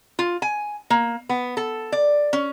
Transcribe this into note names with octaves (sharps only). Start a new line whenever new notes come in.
F4
G#5
A#3
B3
A4
D5
C#4